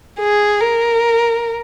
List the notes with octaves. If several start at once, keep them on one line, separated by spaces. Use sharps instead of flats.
G#4
A#4